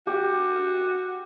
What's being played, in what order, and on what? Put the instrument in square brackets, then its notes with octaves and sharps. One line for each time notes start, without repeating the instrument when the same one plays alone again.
[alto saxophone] F#4 [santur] G4